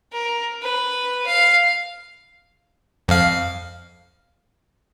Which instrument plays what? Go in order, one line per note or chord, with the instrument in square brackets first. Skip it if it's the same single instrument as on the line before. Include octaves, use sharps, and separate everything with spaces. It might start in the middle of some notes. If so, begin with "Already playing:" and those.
[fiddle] A#4
B4
F5
[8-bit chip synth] F2 F5